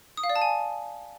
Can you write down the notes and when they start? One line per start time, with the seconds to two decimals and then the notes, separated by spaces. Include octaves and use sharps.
0.17 D#6
0.23 F5
0.30 D5
0.36 A5
0.42 G#5